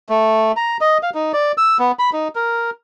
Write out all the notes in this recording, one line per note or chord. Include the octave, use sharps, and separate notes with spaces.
A3
A#5
D#5
F5
D#4
D5
E6
B3
B5
D#4
A#4